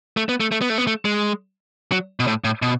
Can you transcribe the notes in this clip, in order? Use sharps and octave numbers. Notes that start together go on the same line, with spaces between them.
A3
B3
A3
A3
B3
A3
B3
A3
G#3
F#3
B2
A2
A2
B2